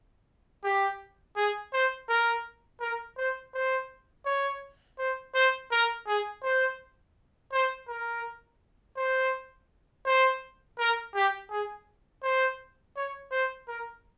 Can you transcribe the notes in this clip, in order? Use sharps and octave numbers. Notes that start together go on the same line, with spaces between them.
G4
G#4
C5
A#4
A#4
C5
C5
C#5
C5
C5
A#4
G#4
C5
C5
A#4
C5
C5
A#4
G4
G#4
C5
C#5
C5
A#4